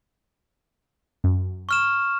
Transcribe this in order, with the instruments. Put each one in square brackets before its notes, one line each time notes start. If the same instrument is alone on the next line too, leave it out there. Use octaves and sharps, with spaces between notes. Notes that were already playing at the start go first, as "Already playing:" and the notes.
[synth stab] F#2
[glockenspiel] C#6 F6 E7